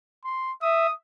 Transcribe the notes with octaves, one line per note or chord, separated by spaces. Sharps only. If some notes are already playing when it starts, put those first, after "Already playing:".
C6
E5 D#6